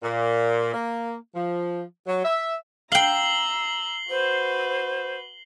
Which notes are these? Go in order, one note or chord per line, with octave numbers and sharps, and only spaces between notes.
A#2
A#3
F3
F#3
E5
F5 G5 A#5 E6 C7 F#7 G7
F#4 B4 C5